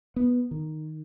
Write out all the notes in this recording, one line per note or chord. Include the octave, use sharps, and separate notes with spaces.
B3
D#3